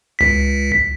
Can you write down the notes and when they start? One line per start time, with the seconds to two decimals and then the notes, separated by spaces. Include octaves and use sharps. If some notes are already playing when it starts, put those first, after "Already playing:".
0.19 C#2 B6